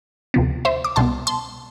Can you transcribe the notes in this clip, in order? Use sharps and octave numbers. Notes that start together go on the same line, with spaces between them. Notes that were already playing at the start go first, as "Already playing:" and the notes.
D2 C3 F3 B3
C5 E5
D6
C2 B2 G3 B3 A5 C6
A5 C6